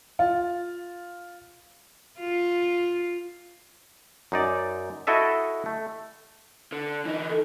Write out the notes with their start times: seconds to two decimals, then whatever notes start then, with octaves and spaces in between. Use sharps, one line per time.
0.19 F4
2.19 F4
4.32 F#2 D#4 D5
5.07 E4 F#4 A4 D#5 E5
5.66 A3
6.72 D3
7.06 E3 D#4
7.29 A4